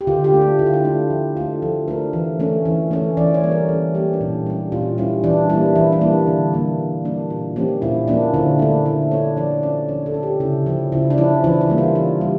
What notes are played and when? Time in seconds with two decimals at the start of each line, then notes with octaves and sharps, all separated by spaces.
0.01 G4
0.07 D3 F4
0.24 G4
0.33 A3 D4
0.42 F4
0.59 D3 E4
0.66 F4
0.74 E4
0.84 A3 D4 E4
1.10 F3 E4
1.37 D4 F4
1.40 A3
1.62 F3 A4
1.88 A3 D4 A#4
2.13 E3
2.40 A3 C#4
2.65 E3
2.91 A3 C#4
3.17 E3 D5
3.34 C#5
3.43 G3 A#3 C#4
3.51 A#4
3.69 E3 A4
3.94 G3 A#3 C#4 G4
4.13 D4
4.21 A#2 E4
4.46 G3 C#4
4.72 A#2 F4
4.98 G3 C#4 E4
5.24 E3 D4
5.49 G3 E4
5.54 A#3
5.75 E3 E4
5.93 D4
6.01 G3 A#3 E4
6.27 D3
6.53 G3 A#3 D4
6.79 D3
7.05 G3 A#3 D4
7.30 A#2 F4
7.56 F3 A#3 C#4 G4
7.82 A#2 E4
8.08 F3 A#3 C#4 D4
8.34 D3 E4
8.59 A3 D4
8.85 D3 E4
9.11 A3 D4 C#5
9.37 F3 D5
9.63 C#4 D5
9.89 F3 C#5
10.06 A4
10.14 C#4
10.23 G4
10.40 C#3 E4
10.66 F3 C#4
10.92 C#3 E4
11.10 D4
11.18 F3 C#4 E4
11.44 E3 E4
11.61 E4
11.70 G3 A#3
11.78 F4
11.95 E3 F4
12.21 G3 F4